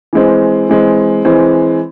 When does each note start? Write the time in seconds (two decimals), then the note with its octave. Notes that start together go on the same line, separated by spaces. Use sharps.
0.13 E3 G#3 C4
0.69 E3 G#3 C4
1.25 E3 G#3 C4